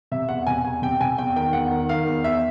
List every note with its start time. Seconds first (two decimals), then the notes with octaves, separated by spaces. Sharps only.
0.11 C3 E5
0.29 E2 F#5
0.47 C3 G#5
0.65 E2 G#5
0.82 C3 G5
1.00 C3 G#5
1.18 E2 G5
1.36 D#3 G5
1.53 E2 F#5
1.71 D#3
1.89 D#3 F5
2.07 E2
2.24 E2 E5